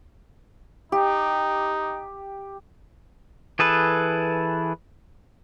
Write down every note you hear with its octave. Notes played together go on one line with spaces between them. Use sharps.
D#4 G4
E3 G#4 A4 B4